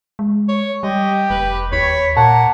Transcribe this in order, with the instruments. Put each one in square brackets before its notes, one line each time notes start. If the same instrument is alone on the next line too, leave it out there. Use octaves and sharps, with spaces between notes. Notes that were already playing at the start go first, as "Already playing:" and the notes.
[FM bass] G#3
[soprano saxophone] C#5
[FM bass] G3 [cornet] G4 [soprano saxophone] D#5
[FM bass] F1 [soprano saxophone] B4
[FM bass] D#2 [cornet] C#5 [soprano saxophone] B5
[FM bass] A#2 [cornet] A#3 [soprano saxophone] F#5 [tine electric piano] A5